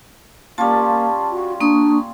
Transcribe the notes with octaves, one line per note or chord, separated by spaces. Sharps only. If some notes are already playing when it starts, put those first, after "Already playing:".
G3 A#3 C#4 F4 A5
F#4
A#3 D4 C#6 D#6